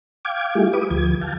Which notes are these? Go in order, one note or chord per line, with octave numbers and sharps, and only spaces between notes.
F5 G5 D6 G#6
G3 A3 E4 F4 G4 G#4
G4 B4 D6 D#6
D2 F3 G#6
F5 G5 A5